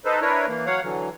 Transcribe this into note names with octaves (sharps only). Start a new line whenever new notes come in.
D#4 A4 B4 C5
D4 E4 A#4 B4 C#5
E3 A#3
F#3 C#5 F5 F#5
D3 E3 F#3